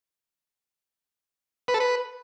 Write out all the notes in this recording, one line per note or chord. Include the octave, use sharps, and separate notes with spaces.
B4
A4
B4